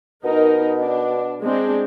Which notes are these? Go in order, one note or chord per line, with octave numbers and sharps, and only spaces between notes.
B2 D#4 A#4
D4
G#3 C4 D4